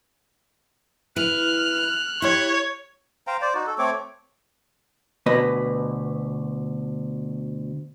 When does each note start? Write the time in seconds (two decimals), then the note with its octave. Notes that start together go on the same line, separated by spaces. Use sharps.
1.16 E4 B4 F6 F#6
2.22 E4 G4 C#5
3.27 C5 F5 G5 A#5
3.41 C5 D5
3.54 D#4 F#4
3.67 A4
3.78 A3 C4 C#5 D6
5.26 D2 B2 B4 D#5